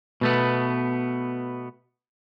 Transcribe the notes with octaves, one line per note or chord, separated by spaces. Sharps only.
B2 A3 B3